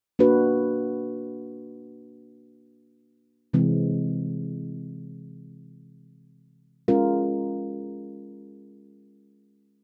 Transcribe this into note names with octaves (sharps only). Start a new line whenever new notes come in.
A#3 D4 F#4 B4
C3 E3 G#3 C4
G#3 C#4 F4 A#4